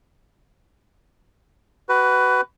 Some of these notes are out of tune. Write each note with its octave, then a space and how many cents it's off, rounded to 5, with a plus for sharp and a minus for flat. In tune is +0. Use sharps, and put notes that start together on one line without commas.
F#4 +25 B4 +10